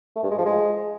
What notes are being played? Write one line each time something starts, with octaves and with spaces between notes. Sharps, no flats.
A3
G2
G#3
F3
G#3